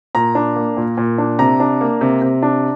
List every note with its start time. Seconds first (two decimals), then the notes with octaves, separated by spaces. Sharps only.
0.15 A#2 A#5
0.35 D4
0.56 A#3
0.77 A#2
0.97 A#2
1.18 D4
1.39 C3 A#5
1.60 D4
1.81 A#3
2.01 C3
2.22 C3
2.43 D4